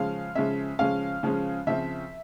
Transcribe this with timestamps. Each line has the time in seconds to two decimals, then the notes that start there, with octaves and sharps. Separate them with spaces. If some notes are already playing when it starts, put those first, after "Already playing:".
Already playing: C#3 F3 G#3 C#4 F5
0.35 C#3 F3 G#3 C#4 E5
0.79 C#3 F3 G#3 C#4 F5
1.23 C#3 F3 G#3 C#4
1.67 C#3 F3 C4 E5